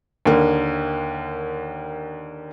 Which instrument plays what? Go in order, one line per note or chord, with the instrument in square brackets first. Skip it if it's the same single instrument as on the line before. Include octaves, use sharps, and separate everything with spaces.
[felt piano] D#2 D3 A#3